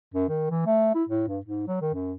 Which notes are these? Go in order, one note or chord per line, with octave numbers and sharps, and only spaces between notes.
F#2
D#3
E3
A3
E4
A2
G2
G#2
F#3
D#3
F#2